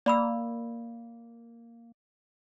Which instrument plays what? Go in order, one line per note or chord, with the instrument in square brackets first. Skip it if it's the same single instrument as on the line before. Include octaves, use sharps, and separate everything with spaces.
[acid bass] A#3 [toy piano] D5 B5 E6